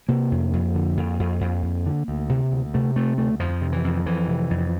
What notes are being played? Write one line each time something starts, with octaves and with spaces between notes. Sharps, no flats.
C3 A#3
F2
F2
D3
F2
F2
F2
F2
D3
D2
C3
D2
C3 A3
C3 A3
D2 A3
F2 F3
C3
E3
F2
F2 E3
C3
F2